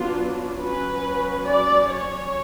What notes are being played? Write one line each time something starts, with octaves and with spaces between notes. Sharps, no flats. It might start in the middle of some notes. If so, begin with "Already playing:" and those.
Already playing: F#3 B3 D4 F4
F#3 C#4 B4
D5
C#5